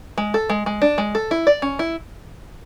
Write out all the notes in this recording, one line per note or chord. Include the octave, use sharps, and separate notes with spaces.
G#3
A4
G#3
G#3
D4
G#3
A4
E4
D5
C#4
E4